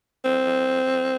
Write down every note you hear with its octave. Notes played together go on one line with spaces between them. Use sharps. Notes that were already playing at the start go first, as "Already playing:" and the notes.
C4